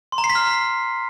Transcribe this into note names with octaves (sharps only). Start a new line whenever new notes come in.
C6
A#5
C7
B6
F6